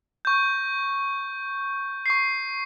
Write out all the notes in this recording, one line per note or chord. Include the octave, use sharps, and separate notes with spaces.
C#6 G6
C#6 C7